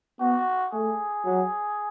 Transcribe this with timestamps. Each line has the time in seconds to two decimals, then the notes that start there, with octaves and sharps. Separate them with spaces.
0.20 B3 F#4
0.73 A3 G#4
1.25 F#3